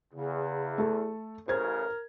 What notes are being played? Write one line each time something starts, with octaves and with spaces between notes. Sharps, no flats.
E2 C#3
A3 A4
A1 C#3 A#4 C5 G#6